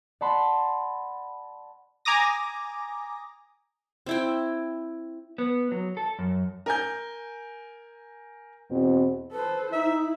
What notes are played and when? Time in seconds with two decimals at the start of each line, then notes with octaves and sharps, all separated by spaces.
0.21 D5 F#5 A5 B5 C6
2.05 G#5 A#5 D6 D#6 A#6
4.06 C4 E4 G5
5.38 B3
5.72 F#3
5.97 A4
6.19 F#2
6.66 A#4 G#5 G6
8.71 E2 B2 C4
9.32 A4 B4 C5
9.72 D#4 E4 E5